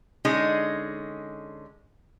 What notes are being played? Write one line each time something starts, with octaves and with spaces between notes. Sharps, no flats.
D3 G#3 C#4 D#4 G#4